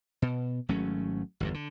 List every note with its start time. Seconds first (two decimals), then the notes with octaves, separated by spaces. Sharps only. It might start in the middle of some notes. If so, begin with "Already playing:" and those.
0.22 B2
0.69 G#1 F#3 A3 C#4
1.40 G1 E2 G2
1.54 D3